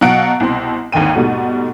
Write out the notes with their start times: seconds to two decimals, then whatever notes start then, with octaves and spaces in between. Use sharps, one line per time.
0.01 B2 F#3 F5 F#5 F#6 D7
0.40 C2 B2 C4 C6
0.92 G#1 D#2 D3 D#3 G5 D#7
1.15 G#2 B2 G3 A3 F#4